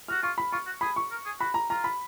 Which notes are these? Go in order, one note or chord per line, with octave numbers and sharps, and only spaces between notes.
F#4 F6
F4 C#6
B5
F4 C#6
F#4
G#4 B5
C#6
A#4
G#4
F#4 B5
A#5
F4 A#5
B5